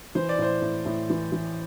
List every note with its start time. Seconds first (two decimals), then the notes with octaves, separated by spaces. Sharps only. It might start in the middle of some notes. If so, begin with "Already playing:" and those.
0.15 E3 C5
0.29 D5
0.38 A2 C5
0.62 A2
0.86 A2
1.10 E3
1.32 E3